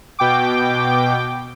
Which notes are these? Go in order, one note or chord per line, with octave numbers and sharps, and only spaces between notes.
B2 G5 D6